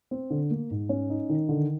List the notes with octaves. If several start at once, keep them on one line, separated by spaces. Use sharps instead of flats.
C4
D3
A#3
G#2
C#4
D#4
D#3
D3